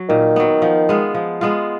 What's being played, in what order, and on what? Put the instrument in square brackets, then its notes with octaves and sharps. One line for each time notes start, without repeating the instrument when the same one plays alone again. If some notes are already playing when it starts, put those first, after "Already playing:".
Already playing: [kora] F#3
[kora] A#2 [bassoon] D#3
[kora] F#3 B3
F3
G#3 B3 F4
F3
G#3 B3 F4